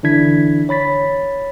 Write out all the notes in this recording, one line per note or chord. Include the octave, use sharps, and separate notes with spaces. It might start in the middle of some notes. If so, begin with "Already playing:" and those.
D3 E3 D4 E4 G#6 B6
C#5 B5 A6 B6